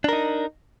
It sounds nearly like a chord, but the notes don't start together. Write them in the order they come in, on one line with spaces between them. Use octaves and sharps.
D4 A#4 D#4